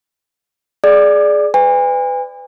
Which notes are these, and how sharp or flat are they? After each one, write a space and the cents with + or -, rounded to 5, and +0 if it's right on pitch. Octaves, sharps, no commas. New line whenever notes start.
G#4 +15 D5 +0 D6 +35
B4 +30 G#5 -40